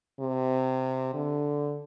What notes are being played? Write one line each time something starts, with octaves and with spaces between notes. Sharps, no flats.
C3
D3